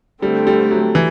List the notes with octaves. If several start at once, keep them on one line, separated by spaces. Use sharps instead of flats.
D3 G3 A3 C4
G3
F#3
E3